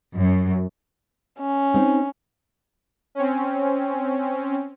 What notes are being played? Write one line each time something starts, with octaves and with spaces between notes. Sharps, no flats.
F#2
C#4
C4 D#4
C4 C#4